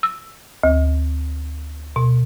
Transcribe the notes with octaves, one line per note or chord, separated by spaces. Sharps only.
E6
D2
B2